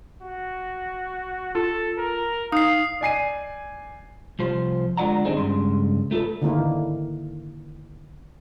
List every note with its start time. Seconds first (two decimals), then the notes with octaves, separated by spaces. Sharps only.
0.22 F#4
1.55 F4 A4
1.98 A#4
2.52 D#4 F5 D#6 C7
3.01 D5 G#5 C7 D#7
4.39 C2 F3 C5
4.97 D3 G#3 F4 D5 F#5 A#5
5.25 D#3 C4 D4 D#4 G#4 C5
5.37 C#2 G2 C#3 C6
6.11 A3 F4 A4 B4
6.42 D3 D#3 A#3 E4